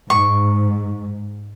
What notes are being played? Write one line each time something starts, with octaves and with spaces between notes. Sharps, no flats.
G#2 C#6